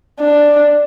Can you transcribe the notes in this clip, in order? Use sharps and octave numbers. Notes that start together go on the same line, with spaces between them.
D4